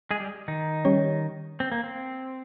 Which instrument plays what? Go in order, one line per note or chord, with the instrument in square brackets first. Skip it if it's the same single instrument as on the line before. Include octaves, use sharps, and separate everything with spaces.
[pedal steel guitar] G#3 G#4
G3 G4
D#3 D#4
[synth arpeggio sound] G3 C#4 G4 C#5
[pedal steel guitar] C4
A#3
C4